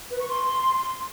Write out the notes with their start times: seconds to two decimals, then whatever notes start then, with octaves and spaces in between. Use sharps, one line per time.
0.11 B4
0.20 C#6
0.29 C6